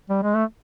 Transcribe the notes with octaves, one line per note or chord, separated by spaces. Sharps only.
G3
G#3
A3